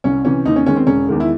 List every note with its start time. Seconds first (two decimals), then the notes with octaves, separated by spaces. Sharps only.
0.04 C2 C#4
0.25 C3 E3 C#4
0.45 D#2 D#4
0.56 C#4
0.66 D#3 G#3 C#4
0.76 C4
0.87 E1 C#4
1.08 E2 D#3 G#3
1.20 E4